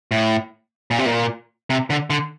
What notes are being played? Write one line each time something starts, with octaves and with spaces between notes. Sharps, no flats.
A2
A#2
C3
A#2
C3
D3
D3